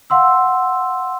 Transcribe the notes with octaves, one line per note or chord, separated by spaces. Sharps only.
F5 F#5 C6 E6